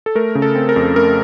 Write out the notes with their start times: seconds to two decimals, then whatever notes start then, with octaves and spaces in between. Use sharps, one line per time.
0.06 A4
0.15 A3 A#4
0.35 C#3
0.42 A4
0.55 C4
0.69 A#4
0.76 F2
0.96 A3 A#4